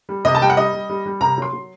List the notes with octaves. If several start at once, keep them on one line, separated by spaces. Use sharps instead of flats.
G3
C3 D#5
A5
G3 G5
F#5
G3 D#5
G3
G3
G3
C3 A#5
F#3 C6
F#3